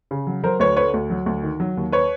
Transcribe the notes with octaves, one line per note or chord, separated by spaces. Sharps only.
C#3
F#3
F#3 A#4 C5
D2 B4 C#5
D3 B4 C#5
D2
F#3
D2
D#3
F#3
D#2
B4 C#5